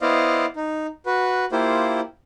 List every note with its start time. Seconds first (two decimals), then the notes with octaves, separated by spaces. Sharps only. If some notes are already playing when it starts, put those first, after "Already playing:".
0.01 B3 E4 C5 D5 D#5 F5
0.56 D#4
1.06 F#4 B4
1.52 A#3 E4 F4 G4 C5